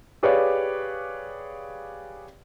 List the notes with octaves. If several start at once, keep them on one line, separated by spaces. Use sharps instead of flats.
G4 G#4 B4 C#5 D5 F5